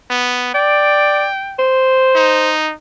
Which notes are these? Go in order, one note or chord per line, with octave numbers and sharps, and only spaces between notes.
B3
D5 G5
C5
D#4